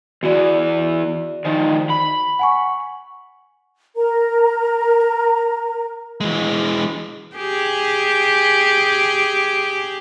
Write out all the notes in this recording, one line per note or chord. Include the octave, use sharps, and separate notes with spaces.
E2 E3 F#4 D5
D#3 F3
B5
F#5 G#5 C#6
A#4 A#5
E3 G#3
G4 G#4